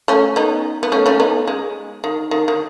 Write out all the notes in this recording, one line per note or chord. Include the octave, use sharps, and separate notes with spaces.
A3 C#4
B3 D#4
B3
A3 C#4
A3 C#4
B3 D#4
G#3
D#3
D#3
D#3